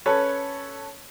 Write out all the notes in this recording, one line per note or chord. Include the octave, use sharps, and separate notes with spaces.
C#4 A4 B4 C#5